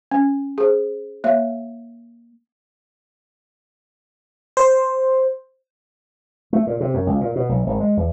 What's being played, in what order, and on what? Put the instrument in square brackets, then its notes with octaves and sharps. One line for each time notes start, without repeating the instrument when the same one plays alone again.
[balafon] C#4
G#4 C5
A#3 C#5 E5
[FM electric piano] C5
[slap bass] A3
A#2
C3
F#2
C#2
A#2
B2
B1
G#1
G#3
E2